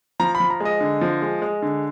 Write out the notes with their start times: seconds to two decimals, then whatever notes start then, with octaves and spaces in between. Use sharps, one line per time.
0.20 F3 A#5
0.35 B5
0.40 F3
0.50 A#5
0.60 G#3 D#5
0.81 D3
1.01 F3
1.22 G#3
1.42 G#3
1.62 D3